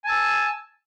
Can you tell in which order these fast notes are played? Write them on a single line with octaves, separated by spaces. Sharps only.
G#5 A5 E6